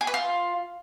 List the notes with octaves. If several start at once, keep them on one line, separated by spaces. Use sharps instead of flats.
G#4
B4
F4